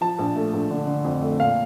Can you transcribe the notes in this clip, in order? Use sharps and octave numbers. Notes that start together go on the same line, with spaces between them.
F3 A5
A#1
A3
A#1
D3
D3
F2
A3
A#2 F5